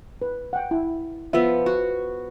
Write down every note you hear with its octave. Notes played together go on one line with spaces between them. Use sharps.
B4
F#5 G5
E4
F3 B3 E5
F#4